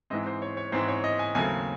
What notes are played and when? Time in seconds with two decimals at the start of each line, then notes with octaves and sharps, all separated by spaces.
0.10 G#2 E3 G#3 C4 D#5
0.26 C5
0.42 C#5
0.57 C#5
0.72 G#2 E3 G#3 C4 C5
0.88 C#5
1.04 D#5
1.19 G#5
1.35 D#2 C#3 F#3 A3 C4 G#5